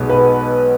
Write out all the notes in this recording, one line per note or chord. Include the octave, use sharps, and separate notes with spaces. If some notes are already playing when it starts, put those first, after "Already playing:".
Already playing: B1 B2 G#3 B3
B4